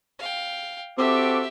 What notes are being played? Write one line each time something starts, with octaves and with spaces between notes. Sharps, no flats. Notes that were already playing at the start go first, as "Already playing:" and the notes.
F5 G5
C4 F#4 G4 A4 E5 D6